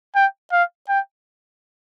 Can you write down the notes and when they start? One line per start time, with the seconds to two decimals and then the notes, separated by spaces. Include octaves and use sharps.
0.15 G5
0.52 F5
0.89 G5